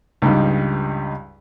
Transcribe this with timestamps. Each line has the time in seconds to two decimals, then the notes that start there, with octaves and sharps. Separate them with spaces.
0.22 C#2 G2 G3 D#4